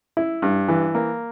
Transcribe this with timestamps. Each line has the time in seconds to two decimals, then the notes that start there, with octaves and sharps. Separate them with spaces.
0.17 E4
0.42 G2
0.68 E3
0.95 A#3